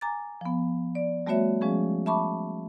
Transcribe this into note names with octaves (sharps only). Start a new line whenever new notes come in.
G#5 A#5 D6 A6
F3 B3
D5
G3 A3 B3 F#4 C#5 E5
F3 G#3 C#4 G#4
E5 A5 B5 C#6 D6